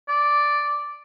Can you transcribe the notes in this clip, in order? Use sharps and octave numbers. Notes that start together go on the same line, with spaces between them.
D5